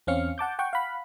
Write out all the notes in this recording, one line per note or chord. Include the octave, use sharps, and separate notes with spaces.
E2 C4 C#4 F5 F6 C#7
F#5 A5 D6 G6
F#5 G5 C#6
F5 F#5 B5